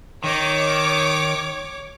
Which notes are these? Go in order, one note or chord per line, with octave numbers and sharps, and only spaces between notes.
D#3 D#4 C#5 D6